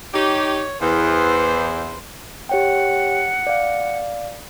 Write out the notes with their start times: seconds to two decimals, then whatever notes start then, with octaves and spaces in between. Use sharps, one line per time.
0.14 D#4 G4 C#5
0.81 E2 B4 C5
2.49 G4 C#5 F#5 G5
3.47 D5 F5